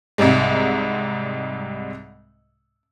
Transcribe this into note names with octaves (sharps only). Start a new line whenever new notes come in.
C2 G#2 C3 G3 G#3